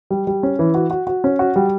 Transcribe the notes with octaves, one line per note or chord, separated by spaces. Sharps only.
G3
G3
C#4
E3
F#4
F#4
F#4
C#4
F#4
G3